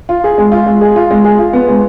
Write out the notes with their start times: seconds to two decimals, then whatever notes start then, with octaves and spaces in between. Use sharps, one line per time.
0.09 F4
0.24 G#4
0.38 G#3
0.52 F4
0.66 G#3
0.81 G#4
0.96 F4
1.11 G#3
1.24 G#4
1.39 F4
1.53 B3
1.68 G#3